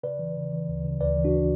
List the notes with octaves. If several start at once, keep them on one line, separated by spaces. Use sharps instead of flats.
C#3 B4 D5
E3
C#3
E3
D2
C#3
D2 B4 D5
E3
D4 F#4